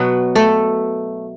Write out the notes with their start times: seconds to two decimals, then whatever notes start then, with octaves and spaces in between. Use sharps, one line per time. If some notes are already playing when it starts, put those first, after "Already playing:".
Already playing: B2 F#3 B3 B4
0.35 A3 A4